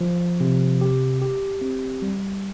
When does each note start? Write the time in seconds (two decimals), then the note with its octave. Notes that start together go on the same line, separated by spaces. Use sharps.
0.01 F3
0.40 C3
0.81 G4
1.22 G4
1.61 C4
2.02 G3